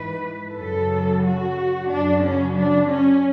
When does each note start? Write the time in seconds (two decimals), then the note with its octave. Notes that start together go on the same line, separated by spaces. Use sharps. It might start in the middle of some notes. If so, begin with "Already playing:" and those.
Already playing: G#2 E3 B4
0.56 F#2 C#3 F#3 A4
1.24 F#4
1.91 F#2 C#3 F#3 D4
2.25 C#4
2.58 D4
2.92 C#4